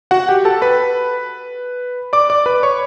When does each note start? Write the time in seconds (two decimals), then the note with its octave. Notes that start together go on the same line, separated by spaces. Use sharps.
0.11 F#4 F#5
0.28 G4 G5
0.45 A4 A5
0.62 B4 B5
2.13 D5 D6
2.30 D5 D6
2.46 B4 B5
2.63 C#5 C#6